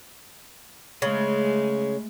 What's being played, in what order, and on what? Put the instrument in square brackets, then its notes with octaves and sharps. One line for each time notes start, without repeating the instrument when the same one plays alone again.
[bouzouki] C#3 [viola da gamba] G#3 A3